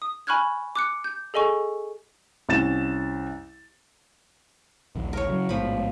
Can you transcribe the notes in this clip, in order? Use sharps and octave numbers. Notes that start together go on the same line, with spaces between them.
D#6
G#5 B5 C#6 F6 F#6 G#6
D6 F#6 C#7
G6
G#4 A4 D#5 G#5 C#6
C2 C#4 A6 E7
A#1 D#2
A#4 C#5
C#3 F#3
A1 G#2 B2 F3 B5